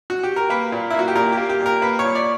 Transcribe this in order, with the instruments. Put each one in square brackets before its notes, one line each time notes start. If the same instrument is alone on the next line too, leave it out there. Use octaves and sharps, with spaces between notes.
[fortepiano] F#4
G4
A#4
A#3 B4
A#2
A#3 E4
F#4
G4
A#2 A#4
A#3 G4
G4
A#2
A#4
A#3 B4
C#5
A#2
D5